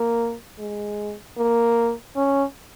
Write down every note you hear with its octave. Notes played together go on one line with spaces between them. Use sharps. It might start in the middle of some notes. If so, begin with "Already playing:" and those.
Already playing: A#3
G#3
A#3
C#4